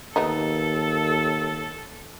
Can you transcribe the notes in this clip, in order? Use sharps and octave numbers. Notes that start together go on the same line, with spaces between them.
D#2 A3 B3 D#4 A4